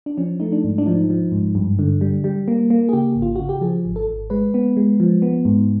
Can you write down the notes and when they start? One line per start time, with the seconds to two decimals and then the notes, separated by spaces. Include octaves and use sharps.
0.06 D4
0.17 F3 C#4
0.40 A3 D#4
0.52 D4
0.64 G#2
0.78 D4
0.86 F3 D#4
1.10 F3
1.32 G#2
1.55 G2
1.79 D3
2.01 G3
2.24 G3
2.48 A#3
2.70 A#3
2.89 G#4
2.93 C#3 G4
3.15 G#1
3.22 F4
3.36 C#3 F#4
3.49 G4
3.61 F3 G#4
3.85 G#1
3.96 A4
4.08 G#1
4.30 G#3 B4
4.54 B3
4.77 G#3
5.00 F3
5.22 B3
5.45 G#2